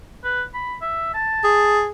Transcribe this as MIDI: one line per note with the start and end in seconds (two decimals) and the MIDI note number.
0.24 0.43 71
0.54 0.75 83
0.81 1.12 76
1.14 1.81 81
1.44 1.92 68